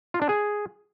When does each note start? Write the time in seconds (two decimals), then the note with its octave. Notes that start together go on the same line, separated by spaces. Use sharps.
0.14 F4
0.22 D4
0.29 G#4